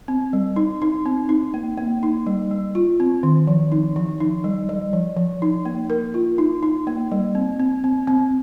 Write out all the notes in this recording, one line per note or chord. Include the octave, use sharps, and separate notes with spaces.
C4
G3
D#4
D#4
C4
D#4
A#3
A#3
D#4
G3
G3
F4
C4
D#3
F3
D#4
F3
D#4
G3
G3
F3
F3
D#4
A#3
A#4
F4
D#4
D#4
A#3
G3
C4
C4
C4
C4